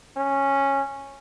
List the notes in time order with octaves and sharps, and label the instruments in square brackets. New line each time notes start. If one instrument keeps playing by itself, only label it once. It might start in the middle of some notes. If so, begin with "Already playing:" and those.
[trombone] C#4